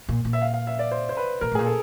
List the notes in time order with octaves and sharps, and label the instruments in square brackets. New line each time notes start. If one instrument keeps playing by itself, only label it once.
[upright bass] A#2
A#2
[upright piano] E5
F5
F5
E5
D5
C5
C5
B4
[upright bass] A#2 [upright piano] A#4
[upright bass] A2
[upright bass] A#2 [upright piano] G#4
[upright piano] A4